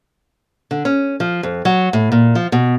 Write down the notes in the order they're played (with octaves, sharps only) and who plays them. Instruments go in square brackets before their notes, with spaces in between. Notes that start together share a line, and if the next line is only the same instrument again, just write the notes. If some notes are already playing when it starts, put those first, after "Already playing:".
[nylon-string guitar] D3
C#4
F3
F2
F#3
A2
A#2
F3
B2